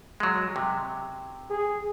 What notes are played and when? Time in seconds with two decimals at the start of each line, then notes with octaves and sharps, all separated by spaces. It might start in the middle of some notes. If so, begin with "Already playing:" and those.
0.20 F#3 G#3
0.56 C3
1.50 G#4